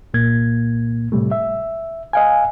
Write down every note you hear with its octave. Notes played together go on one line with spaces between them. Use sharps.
C2 A#2 A#3 G#6
A2 C3 G3 A3
E5
D#5 F5 G#5